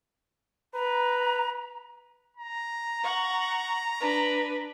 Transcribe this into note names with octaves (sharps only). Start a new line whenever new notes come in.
B4 A#5
A#5
F#5 C#6
D4 B4